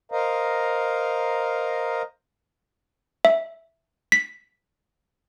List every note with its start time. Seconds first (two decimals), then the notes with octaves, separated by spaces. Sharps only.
0.12 A#4 C5 D#5 F5 A#5
3.25 E5
4.12 B6